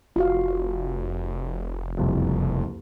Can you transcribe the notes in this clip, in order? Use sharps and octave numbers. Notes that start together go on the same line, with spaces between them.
F1 F4 F#4 F5
F#1 C2 F2